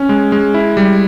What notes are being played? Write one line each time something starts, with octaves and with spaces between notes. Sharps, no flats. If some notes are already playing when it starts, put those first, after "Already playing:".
Already playing: C#4
G#3
G#3
E4
G3